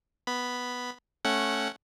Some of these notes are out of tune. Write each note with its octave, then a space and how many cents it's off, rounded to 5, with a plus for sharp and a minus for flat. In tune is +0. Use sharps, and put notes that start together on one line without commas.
B3 +0 B5 +0
A3 +0 C#4 -10 F#5 +5